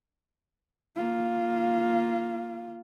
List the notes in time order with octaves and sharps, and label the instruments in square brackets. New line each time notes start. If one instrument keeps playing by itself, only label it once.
[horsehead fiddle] A#3 F4